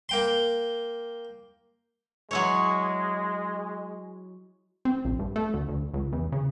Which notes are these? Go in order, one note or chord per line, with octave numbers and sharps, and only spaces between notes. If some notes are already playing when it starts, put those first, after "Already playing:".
A#3 G5 C6
F#3 G#3 E4 C#5
C4
A#1
G2
A3
D2
D2
C#2
E2
C#3